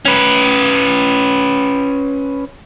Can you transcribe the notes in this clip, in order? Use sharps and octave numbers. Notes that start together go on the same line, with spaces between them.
C#4 B4